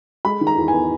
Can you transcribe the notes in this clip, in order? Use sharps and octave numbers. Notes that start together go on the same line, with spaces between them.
G#3 B5
D#3
A#5
E2
B3 G#5